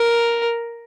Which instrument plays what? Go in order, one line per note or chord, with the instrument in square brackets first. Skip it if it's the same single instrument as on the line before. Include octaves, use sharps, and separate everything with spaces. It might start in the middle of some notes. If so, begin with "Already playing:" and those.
Already playing: [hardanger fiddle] A#4